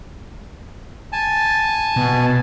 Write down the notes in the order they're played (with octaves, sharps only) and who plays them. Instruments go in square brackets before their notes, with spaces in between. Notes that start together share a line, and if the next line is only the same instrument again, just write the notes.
[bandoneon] G#5 A5
[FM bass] B2